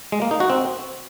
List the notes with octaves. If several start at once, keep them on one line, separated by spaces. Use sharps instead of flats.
G#3
A#3
D#4
F#4
C4